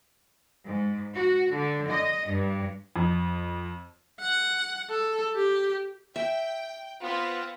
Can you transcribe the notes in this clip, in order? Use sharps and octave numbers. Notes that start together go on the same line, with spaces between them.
G#2
F#4
D3
D#5
G2
F2
F#5
A4
G4
E5 G5
B3 C4 F4 B4